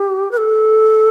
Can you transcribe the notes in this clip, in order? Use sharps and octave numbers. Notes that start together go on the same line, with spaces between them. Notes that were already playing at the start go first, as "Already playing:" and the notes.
Already playing: G4
B4
A4